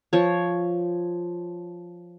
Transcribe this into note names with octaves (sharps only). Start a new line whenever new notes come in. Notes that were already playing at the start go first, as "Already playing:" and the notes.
F3 C#5